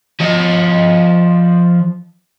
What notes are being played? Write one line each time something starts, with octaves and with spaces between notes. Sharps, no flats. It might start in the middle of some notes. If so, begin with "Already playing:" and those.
F3 D#5